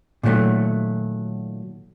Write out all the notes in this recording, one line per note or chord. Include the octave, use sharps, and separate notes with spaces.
A#2 D#3 F#3 G3 A3